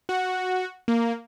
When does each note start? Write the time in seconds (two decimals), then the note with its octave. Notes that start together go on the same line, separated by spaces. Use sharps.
0.09 F#4
0.88 A#3